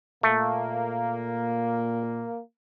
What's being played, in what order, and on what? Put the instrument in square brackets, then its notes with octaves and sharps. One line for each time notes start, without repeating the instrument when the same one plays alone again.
[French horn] A#2 [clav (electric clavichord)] A3 [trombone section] A#3